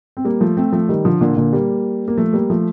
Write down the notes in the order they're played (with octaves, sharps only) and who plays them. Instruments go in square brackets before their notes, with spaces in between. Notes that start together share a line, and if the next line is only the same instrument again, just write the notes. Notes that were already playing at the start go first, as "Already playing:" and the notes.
[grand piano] C4
G3 A#3
F3 A3
A3 C4
F3 A3
D#3 G3
D3 F3
A#2 D3
A#2 D3
G3 A#3
A#3
F3 A3
G3 A#3
F3 A3